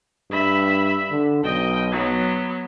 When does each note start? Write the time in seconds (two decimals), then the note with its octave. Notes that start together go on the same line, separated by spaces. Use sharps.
0.31 G2 E5 B5
1.11 D3
1.44 B1 D#5 G5
1.91 F#3 B3